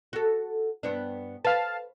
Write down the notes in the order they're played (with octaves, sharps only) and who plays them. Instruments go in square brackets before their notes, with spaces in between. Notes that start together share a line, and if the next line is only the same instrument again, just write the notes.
[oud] F#4 A4
G2 B3 D4
[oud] B4 [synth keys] F5 A5